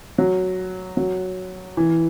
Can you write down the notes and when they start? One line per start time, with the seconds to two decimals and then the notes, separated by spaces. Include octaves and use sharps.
0.18 F#3
0.97 F#3
1.77 E3